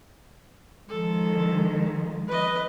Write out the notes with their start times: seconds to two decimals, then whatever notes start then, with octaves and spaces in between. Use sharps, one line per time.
0.89 D#3 F3 G#3 A4
2.27 B4 D#5